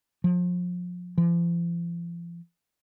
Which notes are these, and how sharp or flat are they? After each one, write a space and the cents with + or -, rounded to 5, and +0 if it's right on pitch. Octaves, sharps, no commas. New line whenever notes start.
F3 +30
F3 -40